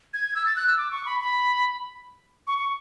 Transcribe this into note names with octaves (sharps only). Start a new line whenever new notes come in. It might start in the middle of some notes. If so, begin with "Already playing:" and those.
G#6
E6
A6
F#6
E6
D6
C#6
B5
B5
C#6
C#6